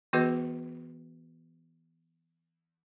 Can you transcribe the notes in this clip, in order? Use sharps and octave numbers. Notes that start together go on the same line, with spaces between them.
E3 B3 F#4 G#4 B4 D#5